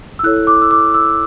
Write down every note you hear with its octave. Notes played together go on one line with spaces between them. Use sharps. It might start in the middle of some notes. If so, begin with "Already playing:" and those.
E6
E4 A4 C#5 F#6
D6
E6
D6
E6